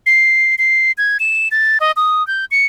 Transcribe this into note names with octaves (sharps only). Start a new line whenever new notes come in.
C7
C7
G#6
E7
A6
D#5
D#6
G6
C#7